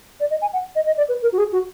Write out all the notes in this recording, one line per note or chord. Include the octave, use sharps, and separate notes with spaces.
D5
D#5
G#5
F#5
D#5
D#5
D5
B4
A#4
F#4
G#4
F#4